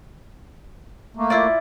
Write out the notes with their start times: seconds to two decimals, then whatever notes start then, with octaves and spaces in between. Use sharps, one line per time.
1.16 A3 A#3
1.30 E4 F4 D5